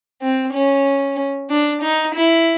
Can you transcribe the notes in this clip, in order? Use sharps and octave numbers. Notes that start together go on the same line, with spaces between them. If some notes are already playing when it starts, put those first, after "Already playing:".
C4
C#4
D4
D#4
E4